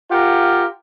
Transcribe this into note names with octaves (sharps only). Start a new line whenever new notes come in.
F4 G4 A#4 F#5